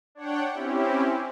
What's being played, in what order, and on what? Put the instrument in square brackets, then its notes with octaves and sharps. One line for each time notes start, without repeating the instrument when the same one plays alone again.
[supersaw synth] D4 C#5 F#5 G5
C4 C#4 E4 G4